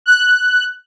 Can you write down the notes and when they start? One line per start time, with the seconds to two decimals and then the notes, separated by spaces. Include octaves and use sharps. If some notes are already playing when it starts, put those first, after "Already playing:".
0.06 F#6